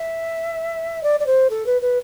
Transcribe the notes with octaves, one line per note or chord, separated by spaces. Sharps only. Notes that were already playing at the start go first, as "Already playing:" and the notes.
Already playing: E5
D5
D5
C5
A4
B4
B4